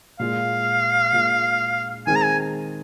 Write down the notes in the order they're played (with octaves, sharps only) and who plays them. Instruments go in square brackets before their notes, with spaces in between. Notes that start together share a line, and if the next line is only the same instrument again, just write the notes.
[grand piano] A#2 G#3 F4 [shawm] F5
[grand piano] A#2 G#3 F4
[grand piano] D#3 G#3 C4 G#4 [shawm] G#5
[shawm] A#5
G#5